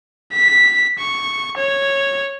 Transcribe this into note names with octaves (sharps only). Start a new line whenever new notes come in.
B6
C#6
C#5